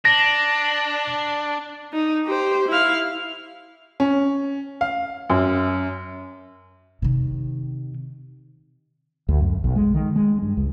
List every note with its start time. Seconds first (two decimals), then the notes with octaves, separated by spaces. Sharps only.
0.05 D4 A#6
1.93 D#4
2.26 G4 C5
2.68 E4 F5
4.00 C#4
4.81 F5
5.30 F#2
7.02 C3 D#3
9.29 D2
9.40 F#2
9.64 B1
9.76 G#3
9.94 D#3
10.16 G#3
10.42 G2
10.57 C#2